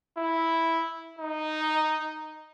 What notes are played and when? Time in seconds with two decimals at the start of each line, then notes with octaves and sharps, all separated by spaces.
0.18 E4
1.19 D#4